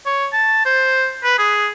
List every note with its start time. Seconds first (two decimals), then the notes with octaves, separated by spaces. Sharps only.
0.06 C#5
0.33 A5
0.66 C5
1.24 B4
1.38 G#4